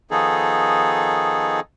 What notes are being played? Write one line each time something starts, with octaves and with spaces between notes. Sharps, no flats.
D#3 F3 B3 D#4 G#4 A4